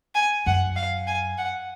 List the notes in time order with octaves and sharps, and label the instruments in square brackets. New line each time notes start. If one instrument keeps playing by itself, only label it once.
[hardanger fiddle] G#5
[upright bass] F#2 [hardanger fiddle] F#5
[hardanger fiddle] F5
G#5
F#5